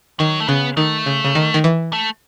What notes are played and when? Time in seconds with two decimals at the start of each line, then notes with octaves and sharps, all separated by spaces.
0.19 D#3 F#3
0.40 A3
0.48 C#3 B3
0.77 D#3 A3
1.06 C#3
1.24 C#3
1.35 D#3
1.54 D#3
1.64 E3
1.93 A3